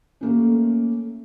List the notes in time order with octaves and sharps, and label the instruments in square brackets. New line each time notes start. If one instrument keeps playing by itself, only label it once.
[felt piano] A3 A#3 C#4